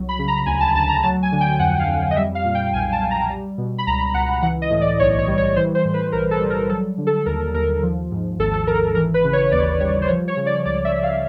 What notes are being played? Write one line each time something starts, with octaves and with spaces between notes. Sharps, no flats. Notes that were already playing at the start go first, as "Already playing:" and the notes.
Already playing: C2 F#3
B5
C#3
A#5
D2 G#5
A5
D2 A5
A#5
F#3 A5
G#5
D3
G5
F2 F#5
F5
F2
D#5
G3 E5
F5
A#2
G5
B1 G#5
A5
B1
A#5
G3
B2
B5
C#2 A#5
C#2 F#5
E3 F#5
D#5
A2
D5
B1 C#5
C#5
G3
C#5
E3 C5
C5
A2
B4
B1 A#4
A4
G3
A#4
F#3 A4
D3
A4
D#2 A#4
D#2 A#4
F3
G#2
G#1 A4
A4
G#1 A#4
E3 A#4
B4
C#3
C#5
D#2 D5
G3 C#5
C5
F3 C#5
C#5
C#3
D5
C#2 D5
E5
C#2
F5